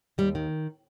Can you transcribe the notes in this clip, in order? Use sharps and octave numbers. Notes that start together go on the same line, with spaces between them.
D#2 G3
D#3